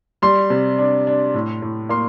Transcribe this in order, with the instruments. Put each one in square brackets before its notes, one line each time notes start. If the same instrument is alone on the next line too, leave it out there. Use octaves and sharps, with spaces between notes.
[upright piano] G3 C6
C3
D4
D4
A2
A2
A#3 C6